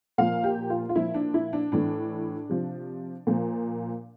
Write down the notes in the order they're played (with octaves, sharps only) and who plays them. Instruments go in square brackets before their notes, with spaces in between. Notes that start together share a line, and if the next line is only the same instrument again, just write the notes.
[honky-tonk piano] A#2 F3 F5
G4
F4
F4
A#2 F3 E4
D4
E4
D4
A2 E3 D4
C3 F3
A#2 F3